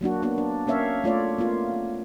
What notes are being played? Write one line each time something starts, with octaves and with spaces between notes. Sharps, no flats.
F#3 A#3 D4 F#4
A#3 B3 D4 F#4
D4
A#3 C#4 C#5 E5 F5
A3 F4 C#5 D5
A#3 B3 F4